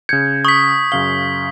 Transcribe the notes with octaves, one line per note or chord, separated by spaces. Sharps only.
C#3 G6 G#6 C#7
C#6 D#6 B6
F#2 C#3 F5 G7